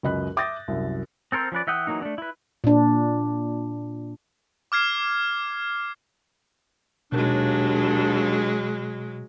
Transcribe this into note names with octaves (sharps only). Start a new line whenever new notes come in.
C#2 F#2 D#5 B5 F#6
E5 D6 D#6 G6 A6 A#6
C2 F#2
C4 A4 A#4 C5
F3 C#4 B4 D5
E3 E5 F#5 G5 D#6
E3 F#3 A#3 D#4
A3 D4
E4 B4
A#2 D4
D6 F6 G#6 C7
D#2 B2 F#3 G#3 D4